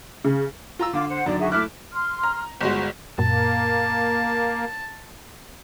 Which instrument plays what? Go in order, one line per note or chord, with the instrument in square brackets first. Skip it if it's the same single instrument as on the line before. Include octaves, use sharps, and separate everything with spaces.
[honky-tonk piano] C#3
[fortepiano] F4 A#5 E6
[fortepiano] D3 [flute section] F4 D6
[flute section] C5 F#5
[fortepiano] F#2 D3 D#3 [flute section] D5
[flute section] F#4 G#4 E5
[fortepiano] A3 E4 F#6 [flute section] E5 D6 F6
[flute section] C6 F6
[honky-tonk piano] A#5
[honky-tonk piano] G1 G#3 F#4 [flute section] C5
[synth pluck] F#2 A#2 [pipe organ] A#3 [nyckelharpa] A5